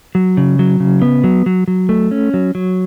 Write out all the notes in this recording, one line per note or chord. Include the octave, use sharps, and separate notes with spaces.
F#3
C#3
F#3
C#3
B3
F#3
F#3
F#3
A3
C#4
F#3
F#3